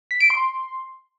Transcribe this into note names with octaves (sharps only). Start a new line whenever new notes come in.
B6
D7
C6